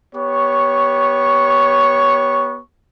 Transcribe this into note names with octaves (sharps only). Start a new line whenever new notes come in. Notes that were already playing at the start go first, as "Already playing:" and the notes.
B3 G4 C#5 C#6